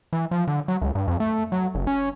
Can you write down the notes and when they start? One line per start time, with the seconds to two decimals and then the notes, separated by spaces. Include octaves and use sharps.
0.13 E3
0.31 F3
0.47 D3
0.68 F#3
0.81 C#2
0.95 G2
1.08 F2
1.20 A3
1.52 F#3
1.75 F#1
1.87 C#4